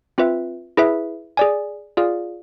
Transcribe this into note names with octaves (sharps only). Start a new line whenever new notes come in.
C4 F4 B4 E5
E4 G#4 B4 E5
G#4 D5 G#5
F4 G#4 D5 F5